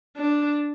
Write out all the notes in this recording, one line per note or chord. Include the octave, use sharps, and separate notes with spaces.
D4